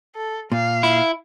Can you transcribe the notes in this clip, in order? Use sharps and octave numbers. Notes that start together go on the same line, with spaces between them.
A4
A#2 F5
E4